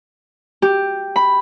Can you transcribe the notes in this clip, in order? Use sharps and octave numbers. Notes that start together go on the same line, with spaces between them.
G4
B5